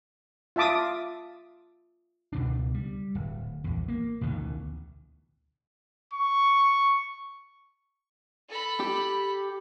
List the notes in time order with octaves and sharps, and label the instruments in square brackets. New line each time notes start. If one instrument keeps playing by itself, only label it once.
[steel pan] F4 E5 A5 D6 D#6
[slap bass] C#2 B2 D4
G3
D1
A#1 E2
A#3
A1 D2 B2 D#3
[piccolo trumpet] C#6
[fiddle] A4 B5
[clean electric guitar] G4